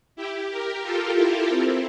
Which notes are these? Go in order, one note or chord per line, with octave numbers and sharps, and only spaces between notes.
E4 G4
G4 A#4
F4 A4
E4 G4
C4 E4